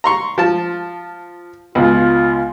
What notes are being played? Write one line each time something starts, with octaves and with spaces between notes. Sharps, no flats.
A#5 C6 C#6
F3 A5
C#2 B2 F4